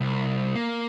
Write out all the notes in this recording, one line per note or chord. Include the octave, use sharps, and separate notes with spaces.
C2
A#3